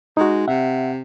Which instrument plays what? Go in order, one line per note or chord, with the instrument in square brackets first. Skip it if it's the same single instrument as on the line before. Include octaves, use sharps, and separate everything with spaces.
[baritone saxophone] G#3 [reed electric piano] D#4 F#4
[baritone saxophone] C3 [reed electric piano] E5 F#5